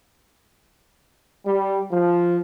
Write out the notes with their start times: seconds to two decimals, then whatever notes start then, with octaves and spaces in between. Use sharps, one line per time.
1.45 G3
1.91 F3